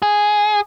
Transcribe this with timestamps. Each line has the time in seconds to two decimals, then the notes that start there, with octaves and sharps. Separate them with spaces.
0.02 G#4